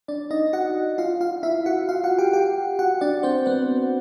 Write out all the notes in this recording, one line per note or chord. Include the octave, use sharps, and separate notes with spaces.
D4 D5
D#4 D#5
F#4 F#5
F4 F5
F4 F5
E4 E5
F#4 F#5
F4 F5
F#4 F#5
G4 G5
G4 G5
F#4 F#5
D4 D5
C4 C5
B3 B4